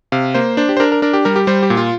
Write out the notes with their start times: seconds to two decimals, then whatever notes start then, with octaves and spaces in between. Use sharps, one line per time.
0.12 C3 F5
0.34 A#3 C5
0.57 D4 C5
0.69 G4
0.77 C5
0.80 D4 A#4
0.92 A#4
1.02 D4 A#4
1.13 G4
1.25 G3 A#4
1.36 G4
1.47 G3 C5
1.63 G4
1.70 A#2
1.77 F4